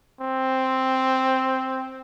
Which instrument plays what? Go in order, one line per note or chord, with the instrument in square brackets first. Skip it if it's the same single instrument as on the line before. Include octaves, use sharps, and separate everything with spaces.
[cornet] C4